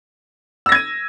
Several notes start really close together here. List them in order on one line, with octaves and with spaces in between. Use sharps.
E6 A#6 G#6 D#7